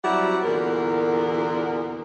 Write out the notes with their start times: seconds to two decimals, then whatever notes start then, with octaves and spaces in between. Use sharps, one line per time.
0.04 F#3 G3 C4 E4 F#4 F#5
0.43 E2 A#2 D3 F#4 A#4